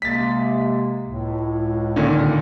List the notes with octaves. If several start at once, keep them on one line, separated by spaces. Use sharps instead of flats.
C3 G#3 A#3 A6 B6
C#2 A2
A#2 D3 D#3